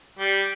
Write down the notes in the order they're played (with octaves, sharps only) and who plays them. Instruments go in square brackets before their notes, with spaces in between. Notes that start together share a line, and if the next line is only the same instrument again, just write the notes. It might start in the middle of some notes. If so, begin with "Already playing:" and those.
[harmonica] G3